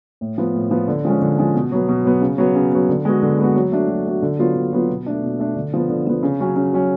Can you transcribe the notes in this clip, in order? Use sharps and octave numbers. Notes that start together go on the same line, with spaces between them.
A2
F3 B3
A2
F3 B3
D3
F3 G#3 C#4
D3
F3 G#3 C#4
B2
F#3 B3
B2
F#3 B3
C#3
F#3 B3
C#3
F#3 B3
D3
G#3 B3 F#4
D3
G#3 B3 F#4
F#3
A3 D4 F#4
F#3
A3 D4 F#4
D3
F#3 B3 F4
D3
F#3 B3 F4
B2
A3 D4
B2
A3 D4
D3
F3 B3
D3
F3 B3
C#3
F#3 C#4
C#3
F#3 C#4